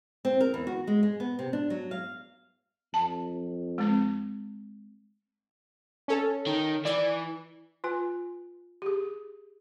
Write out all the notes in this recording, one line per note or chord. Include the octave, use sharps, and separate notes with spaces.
C4
A#4
E2
F#4
G#3
G#3
B3
C3
D4
F#3
F5
F2 A5
G#3 C4
C#4 A4
D#3
E3 D5
F4 B4 G#5
G4 G#4